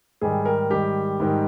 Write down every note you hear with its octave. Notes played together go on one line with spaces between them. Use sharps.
G#2 D#3 G3 G#4
A#4
G#2 D#3 G3 G4
G#2 D#3 G3